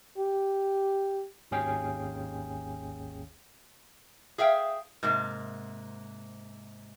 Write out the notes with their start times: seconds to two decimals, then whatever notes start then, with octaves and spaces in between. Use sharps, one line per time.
0.18 G4
1.51 G#1 D#2 C#4 G#4 F5 G5
4.38 G#4 E5 F5 G5
5.03 G#2 C3 A#3